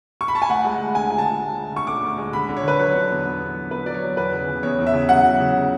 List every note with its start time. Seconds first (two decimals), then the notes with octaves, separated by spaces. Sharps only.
0.21 C#6
0.28 B5
0.35 A5
0.42 G#5
0.49 D2 F#5
0.64 G#3
0.80 D2
0.95 D3 G#5
1.10 G#3 G#5
1.18 A5
1.26 G#3
1.41 D2
1.57 D2
1.72 D3 C#6
1.87 D3 D6
2.03 D2
2.18 G#3
2.33 D3 B5
2.49 D3
2.57 C#5
2.64 D3 B4
2.79 F#3 C#5
2.94 D3
3.10 E2
3.26 B3
3.41 D3
3.55 F#3
3.71 B3 B4
3.86 F#3 D5
3.94 C#5
4.01 F#3
4.17 E2 B4
4.32 C#3
4.48 C#3
4.63 E2 C#5
4.79 E2
4.87 E5
4.93 C#3
5.08 F#3 F#5
5.24 F#3
5.40 C#3